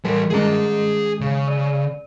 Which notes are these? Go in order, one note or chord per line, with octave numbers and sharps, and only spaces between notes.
E3 G3 A4 A#4
D#3 G#3 C#4 G#4 A#5
C#3
D5